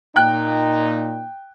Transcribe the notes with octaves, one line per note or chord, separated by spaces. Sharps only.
A#2 D#4 G5 F#6